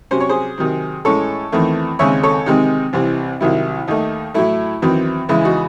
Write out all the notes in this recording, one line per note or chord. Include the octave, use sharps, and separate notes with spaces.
C3 F#3 C#4 C5
C#5
G#4 C5
C3 D#3 F#3 C4
A2 G#3 C#4 A4 C#5
E2 D#3 A3 C4
D#2 C#3 G#3 C4 C#5 E5
A4 C#5
C3 D#3 G#3 C4 D#4
C2 C3 E3 C4
C2 C3 D#3 F#3 E4
D#2 D#3 A3 D#4
A2 F#3 A3 E4
E2 D#3 F#3 C4
E2 C#3 G#3 E4
D#4 F#4